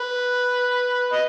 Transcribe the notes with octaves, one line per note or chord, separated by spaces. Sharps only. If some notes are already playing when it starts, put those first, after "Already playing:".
Already playing: B4
D#5